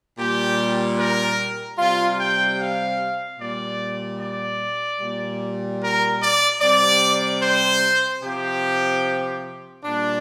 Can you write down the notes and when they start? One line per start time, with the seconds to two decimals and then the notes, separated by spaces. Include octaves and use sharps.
0.16 A#2 G3 G4
0.97 A#4
1.77 C3 G3 F4
2.17 G5
2.57 F5
3.38 A#2 G3 D5
4.19 D5
4.99 A#2 G3
5.80 A#4
6.20 D5
6.60 C3 G3 D5
7.41 C5
8.21 C3 F3 G4
9.82 A#2 G3 D4